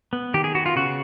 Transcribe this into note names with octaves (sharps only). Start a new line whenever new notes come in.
B3
D#3 G4
G#4
B3 F#4
F4
C#3 F#4